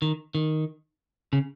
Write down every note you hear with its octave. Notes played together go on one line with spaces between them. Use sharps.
D#3
D#3
C#3